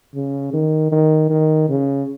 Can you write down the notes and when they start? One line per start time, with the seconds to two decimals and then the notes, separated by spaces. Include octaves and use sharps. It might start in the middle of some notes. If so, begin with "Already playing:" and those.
0.15 C#3
0.53 D#3
0.92 D#3
1.30 D#3
1.69 C#3